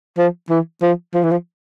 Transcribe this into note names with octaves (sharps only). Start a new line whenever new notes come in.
F3
E3
F3
F3
E3
F3